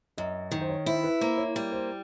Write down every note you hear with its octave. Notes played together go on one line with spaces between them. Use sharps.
F#2 D#5
D#3
C5
C#5
E4 C5
B4
A#3 C5
C#5
G3 C#5
C5